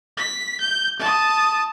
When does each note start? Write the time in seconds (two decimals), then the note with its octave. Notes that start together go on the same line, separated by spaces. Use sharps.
0.17 B6
0.60 G6
0.99 A5 D#6